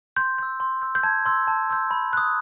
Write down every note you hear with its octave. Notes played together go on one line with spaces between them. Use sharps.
C6 G6
E6 G6
C6
E6 G6
G6
A5 G#6
C6 E6 G6
A5
C6 E6 G6
B5
D#6 F#6